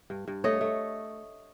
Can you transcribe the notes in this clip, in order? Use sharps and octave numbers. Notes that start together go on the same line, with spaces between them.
G2
G2
A3 C#5 D#5
A3